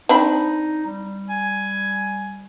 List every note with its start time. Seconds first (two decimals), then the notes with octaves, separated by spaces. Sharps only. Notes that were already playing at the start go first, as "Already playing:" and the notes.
0.09 C4 D4 D#4 B5
0.86 G3
1.29 G#5